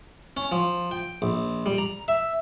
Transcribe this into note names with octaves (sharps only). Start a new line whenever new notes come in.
C#4
F3
G5
A#1
G3
A#5
E5